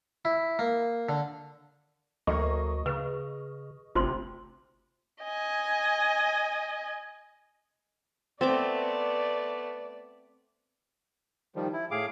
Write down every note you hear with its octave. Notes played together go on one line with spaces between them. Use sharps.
E4
A#3
D3
D2 F#3 A3 A#3 D#5 C#6
C#3 B4 F6
G1 D2 C3 F4 C5 C6
D#5 G#5
A3 B3 C4 D5 E5 D6
D#3 F3 G3
E4
A2 G#4 F5 D6